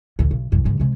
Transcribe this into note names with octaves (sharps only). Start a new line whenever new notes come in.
A1 D2
B1
C2 F#2
G#2 D3
C3 G#3